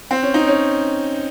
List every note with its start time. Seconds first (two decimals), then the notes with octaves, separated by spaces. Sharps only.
0.11 C4
0.23 C#4
0.34 D#4
0.47 C#4